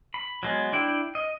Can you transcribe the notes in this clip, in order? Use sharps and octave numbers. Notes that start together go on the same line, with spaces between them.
B5
F#3 G#3 B3
D4 E4 G5
D#5